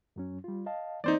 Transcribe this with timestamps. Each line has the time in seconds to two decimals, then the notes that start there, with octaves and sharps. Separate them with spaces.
0.16 F#2 F#3 C#4
0.44 G3 F4
0.66 D#5 F5 A5
1.04 E3 A#3 C4 D#4 C5 D5